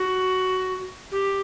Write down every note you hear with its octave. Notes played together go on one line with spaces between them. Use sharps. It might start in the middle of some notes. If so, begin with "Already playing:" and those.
Already playing: F#4
G4